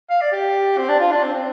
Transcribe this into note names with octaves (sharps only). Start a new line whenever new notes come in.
F5
D5
G4
C4
D4
F4
D4
C4
C4